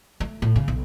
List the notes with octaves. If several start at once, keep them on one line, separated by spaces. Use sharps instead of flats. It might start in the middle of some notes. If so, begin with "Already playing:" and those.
A3
A2
C#3
B1